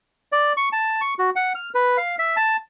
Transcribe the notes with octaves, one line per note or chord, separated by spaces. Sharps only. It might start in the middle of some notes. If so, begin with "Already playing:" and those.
D5
C#6
A5
C#6
F#4
F#5
F6
B4
F5
E5
A5